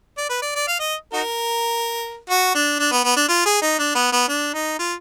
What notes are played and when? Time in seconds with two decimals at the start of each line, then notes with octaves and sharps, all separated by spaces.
0.17 D5
0.29 B4
0.42 D5
0.55 D5
0.67 F5
0.80 D#5
1.13 D#4 F#4 A#4
2.30 F#4
2.55 D4
2.79 D4
2.92 B3
3.05 B3
3.16 D4
3.29 F4
3.46 G#4
3.62 D#4
3.79 D4
3.95 B3
4.12 B3
4.28 D4
4.54 D#4
4.79 F4